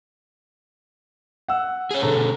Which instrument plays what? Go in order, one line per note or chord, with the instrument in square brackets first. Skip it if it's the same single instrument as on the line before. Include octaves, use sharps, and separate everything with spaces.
[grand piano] F#5 E6
[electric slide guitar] G#4 C#5
[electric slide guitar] B2 D3 [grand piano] G#4 A4 A#5